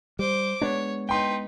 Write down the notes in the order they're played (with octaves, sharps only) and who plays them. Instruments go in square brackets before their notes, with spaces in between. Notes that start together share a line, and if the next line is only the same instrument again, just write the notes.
[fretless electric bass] G3 [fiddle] C5 D6
[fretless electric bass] G#3 B3 D4 [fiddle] C#5
[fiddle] D#4 B4 [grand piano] G5 C6